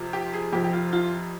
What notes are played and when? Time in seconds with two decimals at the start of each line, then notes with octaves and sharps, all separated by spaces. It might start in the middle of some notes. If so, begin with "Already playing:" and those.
Already playing: F2 C3 F3
0.13 G4
0.34 G#4
0.53 F2 C3 F3 G4
0.64 G4
0.73 F4
0.93 F4